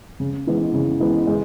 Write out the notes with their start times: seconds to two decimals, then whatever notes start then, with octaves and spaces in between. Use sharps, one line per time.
0.20 C#3
0.47 E3 G#3 B3
0.74 C#3
1.00 E3 G#3 B3
1.27 G#3